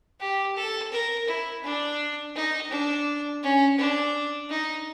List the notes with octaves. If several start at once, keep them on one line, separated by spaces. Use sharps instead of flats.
G4
A4
A#4
E4
D4
D#4
D4
C#4
D4
D#4